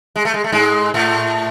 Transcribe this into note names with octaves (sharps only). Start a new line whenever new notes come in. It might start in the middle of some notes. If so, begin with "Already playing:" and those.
G#3
A3
G#3
A3
G#2 G#3
A2 A3